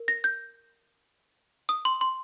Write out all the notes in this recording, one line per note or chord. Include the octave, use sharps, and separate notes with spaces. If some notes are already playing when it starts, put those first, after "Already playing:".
Already playing: A#4
A#6
G6
D#6
C6
C6